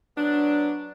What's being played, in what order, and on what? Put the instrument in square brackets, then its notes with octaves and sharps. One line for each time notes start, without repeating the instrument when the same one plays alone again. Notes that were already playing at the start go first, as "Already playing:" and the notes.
[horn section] F#3 B3 D4